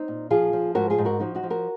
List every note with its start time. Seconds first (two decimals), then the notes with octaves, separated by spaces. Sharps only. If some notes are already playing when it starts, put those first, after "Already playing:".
Already playing: C4 D#4
0.08 A#2
0.31 F3 F4 G#4
0.53 F3
0.75 G#2 F#4 A#4
0.90 F4 G#4
0.98 G#2
1.05 F#4 A#4
1.20 F3 D#4 F#4
1.35 D#4 F#4
1.43 F3
1.50 F#4 A#4